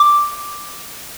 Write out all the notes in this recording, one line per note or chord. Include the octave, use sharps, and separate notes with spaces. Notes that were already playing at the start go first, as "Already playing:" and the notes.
Already playing: D6